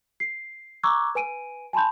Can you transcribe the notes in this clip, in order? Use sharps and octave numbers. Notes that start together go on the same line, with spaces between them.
C7
A#5 C#6 D6 E6 F#6 G#6
B4 G#5 D7 D#7
G#5 A5 B5 C6 G6